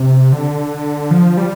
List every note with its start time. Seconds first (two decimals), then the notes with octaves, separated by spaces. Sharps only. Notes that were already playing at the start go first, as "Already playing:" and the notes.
Already playing: C3
0.32 D3
1.11 F3
1.37 G3